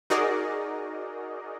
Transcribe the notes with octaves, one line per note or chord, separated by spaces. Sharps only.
D#4 F#4 G#4 A#4 D5 D#5